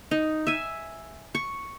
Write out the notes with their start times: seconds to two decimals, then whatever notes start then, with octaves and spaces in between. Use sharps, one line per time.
0.11 D#4
0.47 E5 G#5
1.35 C#6